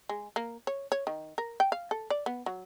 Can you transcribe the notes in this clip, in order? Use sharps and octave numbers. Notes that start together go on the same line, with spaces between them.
G#3
A#3
C#5
C#5
D#3
A#4
G5
F5
A4
D5
B3
F#3